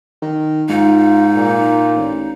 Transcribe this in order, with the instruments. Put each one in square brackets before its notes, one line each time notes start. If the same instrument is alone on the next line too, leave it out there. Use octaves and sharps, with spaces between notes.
[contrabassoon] D#3
[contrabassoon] G#2 [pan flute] D#4 [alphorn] F4
[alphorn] A#2
[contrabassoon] A1